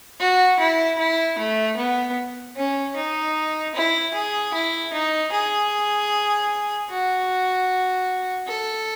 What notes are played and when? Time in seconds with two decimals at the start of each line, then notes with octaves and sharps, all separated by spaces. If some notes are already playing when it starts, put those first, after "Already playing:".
0.20 F#4
0.59 E4
0.98 E4
1.38 A3
1.77 B3
2.56 C#4
2.96 D#4
3.75 E4
4.14 G#4
4.54 E4
4.93 D#4
5.32 G#4
6.90 F#4
8.48 A4